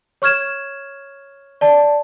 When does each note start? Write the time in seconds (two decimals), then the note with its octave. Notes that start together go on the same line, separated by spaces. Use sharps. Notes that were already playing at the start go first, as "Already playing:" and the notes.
0.22 C#5 C#6 F6 G#6 E7
1.61 D5 A5